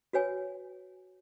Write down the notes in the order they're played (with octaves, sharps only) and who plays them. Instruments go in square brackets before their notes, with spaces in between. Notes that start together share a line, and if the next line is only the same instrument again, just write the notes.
[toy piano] F#4 B4 C#5 G#5